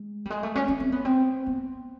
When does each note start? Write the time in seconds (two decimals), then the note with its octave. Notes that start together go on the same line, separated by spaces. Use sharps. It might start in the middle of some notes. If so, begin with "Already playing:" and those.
Already playing: G#3
0.25 G3
0.30 G#3
0.43 A3
0.56 C#4
0.68 C#4
0.80 C4
0.92 B3
1.05 C4
1.46 B3